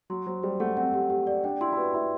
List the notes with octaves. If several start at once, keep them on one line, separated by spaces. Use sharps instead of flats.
F#3 C6
F#3 C5
G3 C5
A3 F#5
C4 F#5
G4
G4
D5
D4 G5
E4 C6
E4
F#4 B4
E4 E5